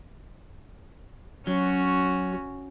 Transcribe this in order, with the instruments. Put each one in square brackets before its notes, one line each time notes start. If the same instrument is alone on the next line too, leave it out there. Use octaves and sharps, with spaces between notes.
[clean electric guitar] F#3 [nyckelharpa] C#4 F#4